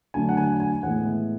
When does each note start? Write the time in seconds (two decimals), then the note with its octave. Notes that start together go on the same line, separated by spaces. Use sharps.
0.14 D3 F#3 A3 D4 G#5
0.29 F#5
0.37 G#5
0.60 G#5
0.83 A2 E3 G#3 B3 F#5